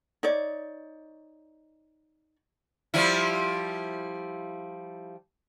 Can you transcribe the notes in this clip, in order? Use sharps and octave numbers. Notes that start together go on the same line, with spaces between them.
D#4 C#5 D5
F3 G3 E4